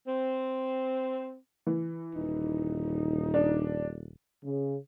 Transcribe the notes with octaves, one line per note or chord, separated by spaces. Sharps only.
C4
E3
D#1 D#4
D4
C#3